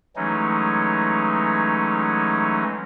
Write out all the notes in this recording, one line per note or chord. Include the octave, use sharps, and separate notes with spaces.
E3 F#3 G#3 A3 C#4 D#4